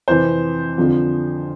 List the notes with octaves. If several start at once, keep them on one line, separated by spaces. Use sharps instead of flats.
F2 C3 E3 C5
F2 D3 F3